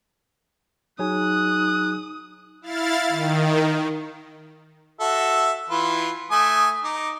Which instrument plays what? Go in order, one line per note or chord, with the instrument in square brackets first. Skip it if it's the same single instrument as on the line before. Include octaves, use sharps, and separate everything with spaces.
[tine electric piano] F#3 G#4 G#5 [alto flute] D#4 [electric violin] D#6 [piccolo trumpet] F#6
[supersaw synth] E4 F5 A6
D#3
[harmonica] F#4 A4 E5
E3 F4 B4
A3 G#5 D#6
D#4 D6